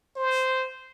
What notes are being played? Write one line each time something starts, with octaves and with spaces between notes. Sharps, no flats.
C5